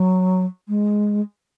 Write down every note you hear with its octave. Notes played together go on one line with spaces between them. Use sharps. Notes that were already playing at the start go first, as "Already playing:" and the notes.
Already playing: F#3
G#3